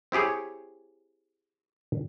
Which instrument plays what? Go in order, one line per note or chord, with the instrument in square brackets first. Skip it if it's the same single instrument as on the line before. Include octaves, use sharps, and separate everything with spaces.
[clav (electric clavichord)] C4 E4 G4 G#4 C#5